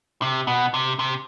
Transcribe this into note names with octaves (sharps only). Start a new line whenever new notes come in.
C3
B2
C3
C3